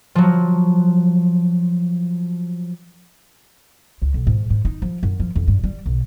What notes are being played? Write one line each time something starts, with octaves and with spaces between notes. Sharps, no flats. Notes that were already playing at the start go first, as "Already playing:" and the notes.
F3 F#3
C#2
B1
G#2
G#2
D#4
F3
F#2
F3
F2
G2
G3
B1